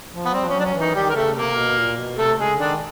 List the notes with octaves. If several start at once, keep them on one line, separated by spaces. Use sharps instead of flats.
F3
B3
G3 C4
F3
C#4
F#3
D4
C#4
E3
D#3 D#4
D#3 G3 G4
A#4
C#3 A3 A4
C3 A#3 A#4
B2
A#2
B2
C3 A3 A4
C#3 G#3 G#4
D3 D#3 D4